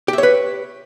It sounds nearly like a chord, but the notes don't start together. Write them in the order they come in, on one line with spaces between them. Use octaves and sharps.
G4 E5 C#5 B4